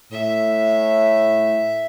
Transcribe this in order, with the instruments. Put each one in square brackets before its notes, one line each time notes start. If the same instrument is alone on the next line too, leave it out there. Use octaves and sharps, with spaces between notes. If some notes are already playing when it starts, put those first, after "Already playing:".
[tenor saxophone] A2 [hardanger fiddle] E5